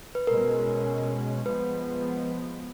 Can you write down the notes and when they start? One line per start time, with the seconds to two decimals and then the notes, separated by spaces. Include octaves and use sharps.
0.15 B4
0.27 B2 G#3 C#4 A#4
1.46 F3 G#3 B3 B4